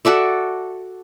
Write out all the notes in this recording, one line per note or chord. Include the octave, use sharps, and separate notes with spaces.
F#4 A4 D5 E5